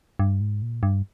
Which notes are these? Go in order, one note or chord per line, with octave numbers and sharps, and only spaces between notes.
G2
G#2
A#2
G2